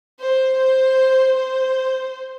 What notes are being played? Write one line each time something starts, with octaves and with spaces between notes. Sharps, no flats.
C5
C5
C5